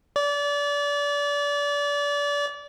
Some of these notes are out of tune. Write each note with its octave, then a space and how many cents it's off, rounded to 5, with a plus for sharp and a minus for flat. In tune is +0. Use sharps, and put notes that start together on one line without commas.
D5 -30